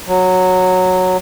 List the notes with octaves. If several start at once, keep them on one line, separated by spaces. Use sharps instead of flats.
F#3